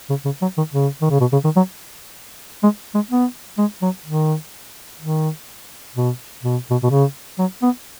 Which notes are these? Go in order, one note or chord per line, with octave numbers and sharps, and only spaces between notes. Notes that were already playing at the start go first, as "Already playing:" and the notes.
C#3
C#3
F#3
D#3
C#3
D#3
C#3
B2
C#3
D#3
F#3
G#3
G#3
B3
G#3
F#3
D#3
D#3
B2
B2
B2
B2
C#3
F#3
B3